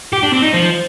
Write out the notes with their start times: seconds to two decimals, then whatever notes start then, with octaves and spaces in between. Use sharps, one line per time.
0.13 G4
0.23 D4
0.33 C4
0.44 D#4
0.54 F3